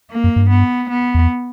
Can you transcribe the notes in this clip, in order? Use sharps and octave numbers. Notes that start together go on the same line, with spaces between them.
A#3
F#2
G2
B3
B3
E2